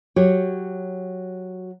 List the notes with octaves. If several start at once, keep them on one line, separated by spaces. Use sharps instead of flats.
F#3 F#4 G4 C#5